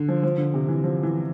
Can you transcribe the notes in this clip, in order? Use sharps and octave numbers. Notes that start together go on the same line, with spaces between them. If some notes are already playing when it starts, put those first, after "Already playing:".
Already playing: D3
F3
F3
D3
C3
E3
F3
E3